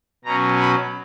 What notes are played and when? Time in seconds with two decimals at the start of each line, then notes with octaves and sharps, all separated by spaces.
0.25 B2 F#3 C#4 A#5
0.61 B5